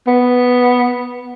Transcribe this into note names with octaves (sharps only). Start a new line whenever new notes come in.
B3